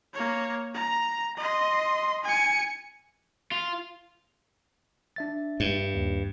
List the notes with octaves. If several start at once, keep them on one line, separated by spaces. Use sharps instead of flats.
A#3 C#5
A#5
D#5 C6
G#5 C#7
F4
D4 E5 A6
G2
D#2